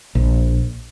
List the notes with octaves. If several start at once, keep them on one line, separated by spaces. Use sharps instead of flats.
A#1